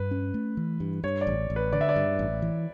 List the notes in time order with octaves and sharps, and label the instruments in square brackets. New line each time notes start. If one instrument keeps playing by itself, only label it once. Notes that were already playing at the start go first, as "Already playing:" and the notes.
Already playing: [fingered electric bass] G2 [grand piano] B4
[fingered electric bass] C#4
A3
E3
G2
[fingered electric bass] G2 [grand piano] C#5
[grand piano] D5
[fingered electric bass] A1
A1
[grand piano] B4
[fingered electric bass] D3 [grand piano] D5
[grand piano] E5
D5
[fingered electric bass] G2
A1
E3